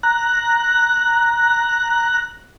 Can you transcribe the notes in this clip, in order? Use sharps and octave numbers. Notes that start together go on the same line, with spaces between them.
A#5 F#6